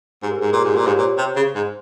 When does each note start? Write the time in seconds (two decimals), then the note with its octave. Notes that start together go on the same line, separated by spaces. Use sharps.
0.23 G#2 G4
0.31 A#4
0.35 G#4
0.42 G#2
0.48 A#4
0.53 A#2
0.61 G#2 G4
0.73 A#2 F4
0.86 G#2 G4
0.94 C#5
0.99 A#2 C5
1.18 C3
1.36 C#3
1.56 G#2